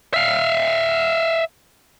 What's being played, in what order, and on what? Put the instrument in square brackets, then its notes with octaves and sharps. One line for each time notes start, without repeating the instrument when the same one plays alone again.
[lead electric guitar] E5 F5